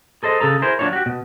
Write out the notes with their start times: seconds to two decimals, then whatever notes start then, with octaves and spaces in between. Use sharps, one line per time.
0.23 G#4 A4 C5 D#5
0.40 C#3 G#4 A4 A#5
0.62 E4 G#4 A#4 C5
0.79 F#3 D4 E4 F4 C#5
0.93 F#4 G4
1.06 B2